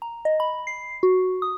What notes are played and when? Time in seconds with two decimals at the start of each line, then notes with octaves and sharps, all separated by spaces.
0.02 A#5
0.25 D#5
0.40 B5
0.67 C7
1.03 F#4
1.42 D#6